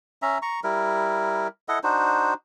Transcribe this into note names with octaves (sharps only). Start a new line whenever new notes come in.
C#4 E5 A#5
A#5 C#6
G3 E4 A#4
E4 A4 D#5 F#5
D4 D#4 F#4 C5